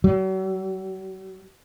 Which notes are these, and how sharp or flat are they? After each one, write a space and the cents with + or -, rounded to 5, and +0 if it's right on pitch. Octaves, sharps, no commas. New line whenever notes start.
F#3 +40